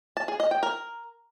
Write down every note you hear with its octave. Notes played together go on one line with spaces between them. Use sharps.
A5
G#4
D#5
G5
A#4